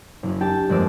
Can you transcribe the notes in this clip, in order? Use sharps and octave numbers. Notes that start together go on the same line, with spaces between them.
F#1 F#2
D4 G4 G5 A5
G1 F2 G#3 A#3 D5 E6